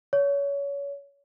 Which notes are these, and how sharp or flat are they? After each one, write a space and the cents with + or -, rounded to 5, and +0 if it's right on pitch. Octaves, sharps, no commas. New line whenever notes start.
C#5 +25